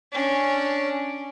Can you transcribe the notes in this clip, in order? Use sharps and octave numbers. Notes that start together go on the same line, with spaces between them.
C#4 D4